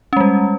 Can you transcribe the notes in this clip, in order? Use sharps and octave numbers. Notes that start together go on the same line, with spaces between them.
G3 G#3 C#4